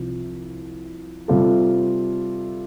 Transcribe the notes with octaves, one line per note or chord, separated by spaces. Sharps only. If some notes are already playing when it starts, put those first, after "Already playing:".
Already playing: C2 C3 F3
C3 G3 C4 F4 A4